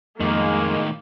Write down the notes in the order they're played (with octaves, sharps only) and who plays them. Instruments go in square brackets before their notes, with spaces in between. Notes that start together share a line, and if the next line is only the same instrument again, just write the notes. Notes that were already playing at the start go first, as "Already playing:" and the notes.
[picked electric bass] F2 [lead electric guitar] A2 D#3 [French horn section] G#3 [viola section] A#3